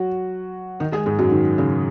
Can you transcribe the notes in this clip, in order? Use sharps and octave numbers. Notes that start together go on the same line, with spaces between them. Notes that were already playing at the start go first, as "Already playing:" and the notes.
Already playing: F#3 F#4
D#3 D#4
G#3 G#4
G#2 G#3
F#2 F#3
D#3
C#3